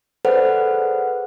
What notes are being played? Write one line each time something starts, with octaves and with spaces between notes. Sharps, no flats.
G#4 A4 B4 C5 D5 F#5